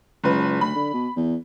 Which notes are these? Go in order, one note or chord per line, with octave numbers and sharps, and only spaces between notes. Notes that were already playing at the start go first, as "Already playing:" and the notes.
F#1 C#2 B4
D2 B5
D3
B2
E2